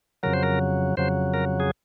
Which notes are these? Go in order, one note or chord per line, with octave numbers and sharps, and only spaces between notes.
F2 C#3 F#3 A#4
C5
A#4
F2 C#3 F#3 C5
A#4
G#4